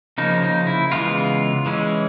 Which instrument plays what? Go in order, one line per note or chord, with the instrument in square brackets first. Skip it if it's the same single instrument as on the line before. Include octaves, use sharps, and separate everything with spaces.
[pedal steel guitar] C#3 F3 A#3 D#4
D#4
E4
C#3 E3 G#3 B3 F4
E3 G#3 C#4